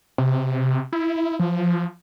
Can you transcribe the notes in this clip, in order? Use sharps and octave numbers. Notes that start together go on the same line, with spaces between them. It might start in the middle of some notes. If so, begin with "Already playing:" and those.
C3
E4
F3